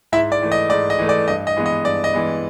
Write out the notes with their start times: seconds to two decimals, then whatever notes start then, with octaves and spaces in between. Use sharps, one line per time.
0.12 G#2 E4 E5
0.32 D5
0.42 E3 A3
0.52 D#5
0.70 G#2 D5
0.90 D#5
0.99 E3 A3
1.09 D5
1.28 G2 D#5
1.47 D#5
1.56 E3 G#3 B3
1.66 D#5
1.85 G2 D5
2.04 D#5
2.13 E3 G#3 B3